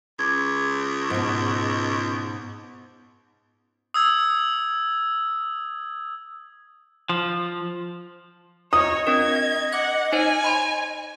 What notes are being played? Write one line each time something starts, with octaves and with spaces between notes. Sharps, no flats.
C#2 D6 G#6
G#2 B2
D#6 E6 G#6
F3
F4 C#5 D#5 D#6
C4 D4 A#4 G#6
F#5 D6 G#6
D#4 C5 C#5 G#5
B5 C6